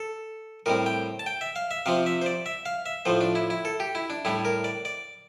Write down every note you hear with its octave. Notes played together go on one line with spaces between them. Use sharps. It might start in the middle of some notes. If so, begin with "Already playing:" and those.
Already playing: A4
A2 G3 C4 A#4
G5
A5
G5
E5
F5
E5
C3 F3 C4 F5
E5
C5
D5
E5
F5
E5
A2 F3 A3 C5
D4
E4
E4
A4
G4
E4
D4
A2 G3 D4 E4
A#4
D5
D5